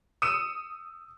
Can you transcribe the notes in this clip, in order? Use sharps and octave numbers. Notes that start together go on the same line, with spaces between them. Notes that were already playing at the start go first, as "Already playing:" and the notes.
D#6 E6 C#7 D#7 E7